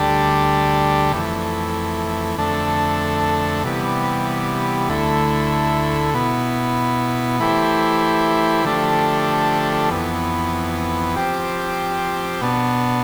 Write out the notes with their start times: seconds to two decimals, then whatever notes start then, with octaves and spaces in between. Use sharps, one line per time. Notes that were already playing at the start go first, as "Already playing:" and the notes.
Already playing: D2 D3 G3 D4 G4
1.12 F2 E3 A3
2.38 F2 D3 A3 D4
3.64 C3 E3 G3 B3
4.88 D2 D3 A3 E4
6.14 B2 B3 E4
7.39 E3 A3 E4 G4 C5
8.64 D3 F3 A3 D4 G4
9.90 F2 E3 B3
11.16 F3 C4 G4
12.41 B2 B3 D4